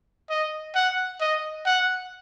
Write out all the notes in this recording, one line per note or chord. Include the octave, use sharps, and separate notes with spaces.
D#5
F#5
D#5
F#5